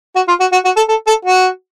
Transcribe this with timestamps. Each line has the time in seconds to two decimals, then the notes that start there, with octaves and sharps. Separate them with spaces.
0.16 F#4
0.28 F4
0.40 F#4
0.52 F#4
0.65 F#4
0.76 A4
0.89 A4
1.07 A4
1.25 F#4